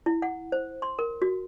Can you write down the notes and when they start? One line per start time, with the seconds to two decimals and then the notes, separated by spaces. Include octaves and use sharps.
0.06 E4
0.22 F#5
0.52 C5
0.82 C6
0.99 A#4
1.22 F#4